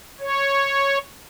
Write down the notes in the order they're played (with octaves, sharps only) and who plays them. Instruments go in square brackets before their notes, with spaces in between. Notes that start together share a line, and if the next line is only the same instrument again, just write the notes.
[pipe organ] C#5